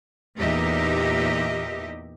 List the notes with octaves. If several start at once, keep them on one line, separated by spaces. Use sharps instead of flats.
E2 A#2 D#4 G4 D#5 E5